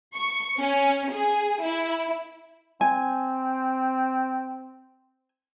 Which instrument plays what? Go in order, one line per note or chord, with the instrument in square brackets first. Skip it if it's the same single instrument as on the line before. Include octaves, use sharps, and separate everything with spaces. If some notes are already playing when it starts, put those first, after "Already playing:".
[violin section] C#6
C#4
G#4
E4
[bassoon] C4 [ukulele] G#5